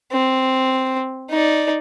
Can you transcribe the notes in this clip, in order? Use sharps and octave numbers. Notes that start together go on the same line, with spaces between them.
C4
D#4 D5